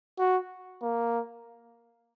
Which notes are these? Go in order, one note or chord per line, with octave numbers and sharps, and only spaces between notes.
F#4
A#3